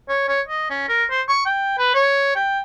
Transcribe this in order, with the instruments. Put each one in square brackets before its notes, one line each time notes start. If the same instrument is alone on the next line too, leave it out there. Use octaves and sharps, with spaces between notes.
[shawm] C#5
C#5
D#5
C#4
A#4
C5
C#6
G5
B4
C#5
G5